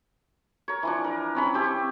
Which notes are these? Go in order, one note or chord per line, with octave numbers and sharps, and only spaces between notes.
A#4 C#5
E3 F3 D4
A#4
C4 C#4 B5
C4 G4 C#5